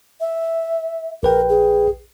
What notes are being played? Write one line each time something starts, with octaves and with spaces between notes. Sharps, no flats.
E5
A#1 A#4 B4 G5
G#4